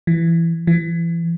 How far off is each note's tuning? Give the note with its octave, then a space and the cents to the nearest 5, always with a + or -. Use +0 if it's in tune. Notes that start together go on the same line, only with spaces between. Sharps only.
E3 +15
E3 +30